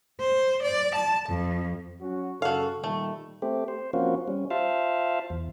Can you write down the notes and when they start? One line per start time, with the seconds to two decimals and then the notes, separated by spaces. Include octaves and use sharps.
0.20 C5
0.62 D5
0.94 A5
1.28 F2
2.02 F#3 C#4 F#4
2.42 F#2 C#3 F#4 A4 F5
2.84 A#2 D#3 G3 A3
3.42 A3 C4 G4
3.68 C5
3.93 F3 A#3 C4 C#4 F4 F#4
4.28 G3 C#4
4.50 F4 C5 E5 F5 A5
5.30 E2